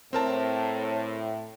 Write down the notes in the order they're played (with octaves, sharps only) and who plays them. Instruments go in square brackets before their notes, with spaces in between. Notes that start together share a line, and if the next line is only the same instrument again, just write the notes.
[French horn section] A2 [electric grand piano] C4 A#4 A5